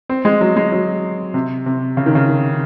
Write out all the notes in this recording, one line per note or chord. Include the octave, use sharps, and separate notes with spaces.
C4
G#3
F#3
G#3
F#3
C3
C3
C#3
D#3
C#3
D#3